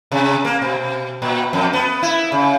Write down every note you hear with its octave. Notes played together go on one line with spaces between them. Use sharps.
C3
A#3
B2
A#2
F2
B3
E4
C#3